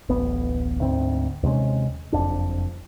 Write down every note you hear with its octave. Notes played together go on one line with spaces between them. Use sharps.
D1 A1 B3
D2 G#2 C4
D#2 C3 G#3 C#4
F#1 F2 D4